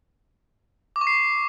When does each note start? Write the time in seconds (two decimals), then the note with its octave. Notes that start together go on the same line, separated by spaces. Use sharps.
0.96 D6
1.01 C#6
1.07 C7